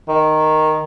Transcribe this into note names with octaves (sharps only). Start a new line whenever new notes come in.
D#3